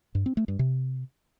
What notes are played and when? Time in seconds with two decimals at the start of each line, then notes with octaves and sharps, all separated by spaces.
0.15 G2
0.26 C4
0.37 A3
0.48 G2
0.59 C3